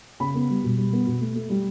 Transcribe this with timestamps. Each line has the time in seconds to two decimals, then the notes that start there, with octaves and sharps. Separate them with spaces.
0.20 C#3 B5
0.35 B3
0.50 G3
0.64 B2
0.78 G3
0.93 B3
1.07 B2
1.21 A3
1.35 A3
1.50 G3